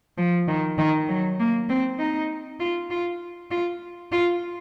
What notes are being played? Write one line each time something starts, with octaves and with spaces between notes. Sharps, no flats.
F3
D#3
D#3
F#3
A#3
C4
D#4
F4
F4
F4
F4